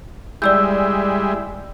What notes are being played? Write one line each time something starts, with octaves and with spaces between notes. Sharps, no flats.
G3 G#3 E4 D5 E6 G6